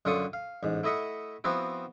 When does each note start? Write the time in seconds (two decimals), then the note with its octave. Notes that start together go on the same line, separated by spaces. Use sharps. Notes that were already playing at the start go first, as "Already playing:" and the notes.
0.05 F#2 D3 F4 A4 C#6 D#6
0.33 F5
0.63 A1 G#2
0.83 A3 E4 D#5 E5 F#5
1.44 F3 B3 C4 E4 F#4